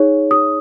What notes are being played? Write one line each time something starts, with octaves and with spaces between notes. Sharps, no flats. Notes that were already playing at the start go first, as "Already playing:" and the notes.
Already playing: D#4 G#4 C#5
D#6